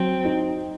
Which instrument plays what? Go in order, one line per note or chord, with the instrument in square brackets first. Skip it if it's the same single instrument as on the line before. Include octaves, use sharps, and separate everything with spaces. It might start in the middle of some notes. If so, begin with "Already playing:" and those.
Already playing: [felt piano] F#3 [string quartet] C4
[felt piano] D#4